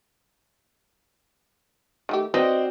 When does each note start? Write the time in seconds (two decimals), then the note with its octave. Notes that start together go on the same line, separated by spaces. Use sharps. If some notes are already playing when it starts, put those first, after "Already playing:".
2.09 D#3 A3 G4
2.34 C4 F#4 B4 D5 D#5 G5